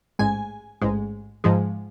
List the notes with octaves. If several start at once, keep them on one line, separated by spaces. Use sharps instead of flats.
A1 G#2 G#3 G#5
A1 G#2 G#3
G#2 F3 G#3